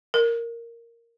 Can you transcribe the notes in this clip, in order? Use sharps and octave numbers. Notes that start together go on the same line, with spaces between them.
A#4